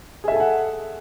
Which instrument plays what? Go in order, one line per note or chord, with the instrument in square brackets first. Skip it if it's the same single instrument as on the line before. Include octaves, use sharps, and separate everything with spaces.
[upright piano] G#4
E5
A4
G#5
F#5